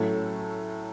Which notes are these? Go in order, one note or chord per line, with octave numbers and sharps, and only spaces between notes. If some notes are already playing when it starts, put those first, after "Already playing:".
Already playing: A2 F#3 A3 C#4 A4